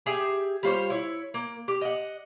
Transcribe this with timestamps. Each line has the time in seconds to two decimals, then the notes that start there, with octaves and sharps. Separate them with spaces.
0.06 G4 G#4 E5 G5
0.63 G3 F4 C5 C#5
0.90 E4 C#5
1.34 A#3
1.68 G4
1.81 D#5 F#5